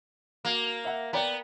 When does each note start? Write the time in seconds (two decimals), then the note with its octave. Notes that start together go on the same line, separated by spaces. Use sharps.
0.45 A#3 F#4
0.85 E5 F#5
1.13 B3 D5 G5 A#5